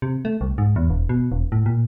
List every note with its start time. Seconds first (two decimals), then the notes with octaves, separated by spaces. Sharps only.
0.02 C3
0.25 A3
0.41 C2
0.58 G#2
0.76 E2
0.90 E1
1.09 B2
1.32 E1
1.52 A2
1.66 A#2